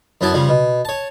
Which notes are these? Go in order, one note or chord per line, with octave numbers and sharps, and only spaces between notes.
F#2 F#3 B3 E4 A5
C#3 F3 G3
B2
C#5 A5